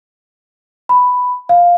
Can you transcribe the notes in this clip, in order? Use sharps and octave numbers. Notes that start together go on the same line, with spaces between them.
B5
F5